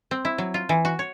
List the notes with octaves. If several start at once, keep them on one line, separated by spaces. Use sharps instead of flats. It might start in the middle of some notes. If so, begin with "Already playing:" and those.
C4
E4
F#3
F4
E3
F#4
C#5